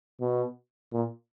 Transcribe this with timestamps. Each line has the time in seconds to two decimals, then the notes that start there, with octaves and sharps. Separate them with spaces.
0.21 B2
0.92 A#2